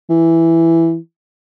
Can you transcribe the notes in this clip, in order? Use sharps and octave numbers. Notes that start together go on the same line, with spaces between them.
E3